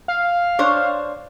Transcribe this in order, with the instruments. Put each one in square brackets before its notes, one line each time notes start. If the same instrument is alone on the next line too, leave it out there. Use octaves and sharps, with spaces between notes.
[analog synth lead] F5
[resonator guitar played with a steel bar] D4 C5 C#5